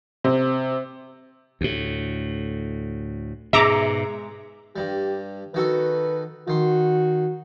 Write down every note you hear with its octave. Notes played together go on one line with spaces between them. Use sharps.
C3
D2 A2
G#2 B2 G#3 E5 A#5 D6
G2 G3 G4
D#3 F#4 A4 B4
D#3 F#4 C6